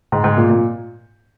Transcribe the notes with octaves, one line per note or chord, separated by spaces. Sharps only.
G#2
G#2
A#2
A#2